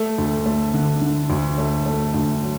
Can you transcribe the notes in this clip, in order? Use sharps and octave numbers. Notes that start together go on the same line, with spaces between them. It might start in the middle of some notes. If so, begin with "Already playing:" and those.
Already playing: A3 A4
D2
A3
D3
D3
D2
A3
A3
D2
F#3